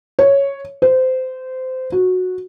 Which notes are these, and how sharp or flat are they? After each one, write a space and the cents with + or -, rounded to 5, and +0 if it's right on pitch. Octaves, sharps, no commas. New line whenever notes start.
C#5 +0
C5 -20
F#4 -10